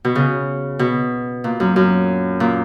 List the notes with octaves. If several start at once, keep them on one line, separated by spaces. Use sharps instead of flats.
B2
C#3
B2
A#2
F#2
F#2
A#2